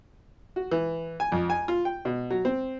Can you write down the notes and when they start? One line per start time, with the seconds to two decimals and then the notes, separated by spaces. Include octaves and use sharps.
0.56 F#4
0.71 E3
1.20 G#5
1.32 F2
1.50 G#5
1.68 F4
1.85 G5
2.05 B2
2.31 F#3
2.45 C4